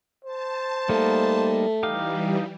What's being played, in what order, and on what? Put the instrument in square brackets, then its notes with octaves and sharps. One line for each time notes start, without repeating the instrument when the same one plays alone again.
[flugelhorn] C5 [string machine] A5
[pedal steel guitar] G3 A#3 D#4 [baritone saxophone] A3
[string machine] E3 G3 [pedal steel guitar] D#4 G4 F5